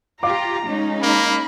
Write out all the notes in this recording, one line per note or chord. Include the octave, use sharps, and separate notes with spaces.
F4 G4 F5 A#5 D6
G#3 C#4 D#4
A#3 B5